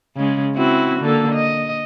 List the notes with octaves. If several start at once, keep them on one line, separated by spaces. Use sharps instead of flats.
C#3 G#3
C4 E4 F#4
D3 A#3 A4
D#5